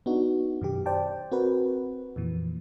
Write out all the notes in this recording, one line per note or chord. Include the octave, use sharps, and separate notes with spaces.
B3 D4 D#4 F#4
F#2 B2 D#3 G4
C5 D5 G5 A5
C4 F#4 A#4 B4
F2 A#2 E3